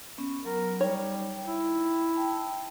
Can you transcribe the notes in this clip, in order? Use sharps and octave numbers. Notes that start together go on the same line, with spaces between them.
B3 C#4
F#3 A#4
G3 D#4 C#5 G5
E4
G5 A5